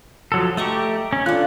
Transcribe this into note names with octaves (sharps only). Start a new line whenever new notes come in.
F3 F#3 A4
A3 G4 D#5 A#5 C#6
C#4
D4 F4 A4 F#6